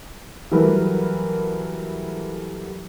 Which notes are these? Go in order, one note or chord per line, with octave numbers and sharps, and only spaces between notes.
E3 F#3 G3 A3 A#4 B4